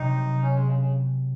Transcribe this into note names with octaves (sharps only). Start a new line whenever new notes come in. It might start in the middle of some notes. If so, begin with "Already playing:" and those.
Already playing: C3 F#3 C4 D#4
C#4
G#3
C#3
C#3